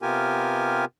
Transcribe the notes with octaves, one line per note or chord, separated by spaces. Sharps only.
C3 B3 F4 G4 A#4 G#5